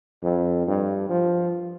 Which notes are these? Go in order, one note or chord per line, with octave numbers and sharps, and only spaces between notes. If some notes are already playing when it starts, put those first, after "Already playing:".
F2
G2
F3